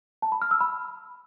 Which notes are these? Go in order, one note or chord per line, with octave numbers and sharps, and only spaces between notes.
A5
B5
F6
E6
B5